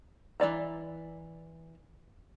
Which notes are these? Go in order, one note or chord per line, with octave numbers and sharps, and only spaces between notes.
E3 C#4 D5 A#5